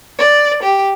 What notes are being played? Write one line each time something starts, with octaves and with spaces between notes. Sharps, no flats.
D5
G4